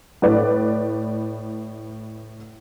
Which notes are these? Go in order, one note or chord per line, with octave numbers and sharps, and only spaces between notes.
A2 B4 D5